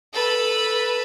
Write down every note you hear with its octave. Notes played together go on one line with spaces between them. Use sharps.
A4 B4